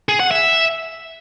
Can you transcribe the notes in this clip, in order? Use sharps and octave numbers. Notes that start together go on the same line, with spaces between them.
G#4
F#5
E5